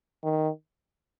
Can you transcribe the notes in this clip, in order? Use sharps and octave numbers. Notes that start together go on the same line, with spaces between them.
D#3